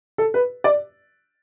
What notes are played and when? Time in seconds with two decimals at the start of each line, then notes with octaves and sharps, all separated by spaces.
0.18 A4
0.34 B4
0.64 D5